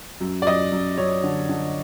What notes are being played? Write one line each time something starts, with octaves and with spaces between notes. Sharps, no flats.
F#2
D5
F#2 D#5
F#2
F#2 C#5
D3
D3